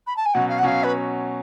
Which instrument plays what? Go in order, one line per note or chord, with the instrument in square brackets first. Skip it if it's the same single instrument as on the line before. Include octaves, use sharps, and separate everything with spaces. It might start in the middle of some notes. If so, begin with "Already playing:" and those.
[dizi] B5
A5
G#5
[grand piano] B2 F#3 C#4 [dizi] F#5
[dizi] F5
F#5
[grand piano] B2 F#3 C#4 [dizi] F5
[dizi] B4